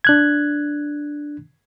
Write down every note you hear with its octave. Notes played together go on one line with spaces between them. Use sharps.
D4 F#6 G#6